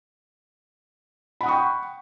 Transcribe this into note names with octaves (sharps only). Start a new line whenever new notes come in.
F#5 G5 B5 C#6 D#6